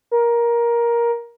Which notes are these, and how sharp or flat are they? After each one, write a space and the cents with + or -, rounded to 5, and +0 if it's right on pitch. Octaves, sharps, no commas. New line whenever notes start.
A#4 +15